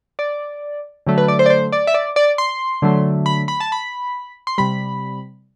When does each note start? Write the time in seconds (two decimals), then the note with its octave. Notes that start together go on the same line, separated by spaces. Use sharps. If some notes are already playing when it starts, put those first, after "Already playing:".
0.19 D5
1.07 D3 F#3 A3
1.18 B4
1.28 D5
1.39 C5
1.46 D5
1.50 C5
1.72 D5
1.87 E5
1.94 D5
2.16 D5
2.38 C6
2.82 D3 F#3 A3
3.26 B5
3.48 B5
3.60 A5
3.72 B5
4.47 C6
4.58 C3 G3 B5